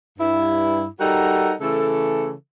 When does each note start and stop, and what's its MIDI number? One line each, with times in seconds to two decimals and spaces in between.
0.18 0.85 43
0.18 0.85 64
1.00 1.52 55
1.00 1.52 63
1.00 1.52 66
1.00 1.52 69
1.00 1.52 70
1.00 1.52 78
1.61 2.32 49
1.61 2.32 52
1.61 2.32 57
1.61 2.32 69